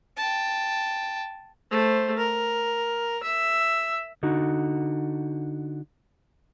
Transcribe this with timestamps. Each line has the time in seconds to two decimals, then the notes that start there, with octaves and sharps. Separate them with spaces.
0.17 G5 A5
1.71 A3 C5
2.17 A#4
3.23 E5
4.23 D3 D#4 F#4